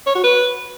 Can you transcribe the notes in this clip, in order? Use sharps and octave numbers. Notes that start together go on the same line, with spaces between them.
C#5
F#4
B4